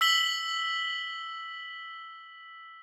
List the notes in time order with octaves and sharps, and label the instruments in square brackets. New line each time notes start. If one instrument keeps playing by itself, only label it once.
[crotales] E6 B6 F#7 G7